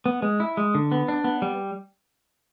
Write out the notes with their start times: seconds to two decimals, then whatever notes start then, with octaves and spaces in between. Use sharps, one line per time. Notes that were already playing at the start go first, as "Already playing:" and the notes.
0.06 B3
0.22 G#3
0.40 E4
0.57 G#3
0.75 D3
0.92 B3
1.08 D4
1.24 B3
1.42 G3